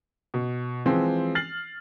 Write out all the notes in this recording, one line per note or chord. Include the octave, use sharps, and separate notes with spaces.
B2
E3 F3 G#3 C4
F6 A6 C7 F#7